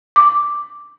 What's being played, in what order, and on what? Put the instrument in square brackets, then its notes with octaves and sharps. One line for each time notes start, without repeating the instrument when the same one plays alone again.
[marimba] D6